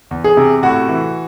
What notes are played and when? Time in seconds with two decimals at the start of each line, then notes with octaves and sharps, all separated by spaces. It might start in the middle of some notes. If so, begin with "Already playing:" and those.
0.11 E2
0.24 G#4
0.37 C3
0.63 A2 F#4
0.89 E3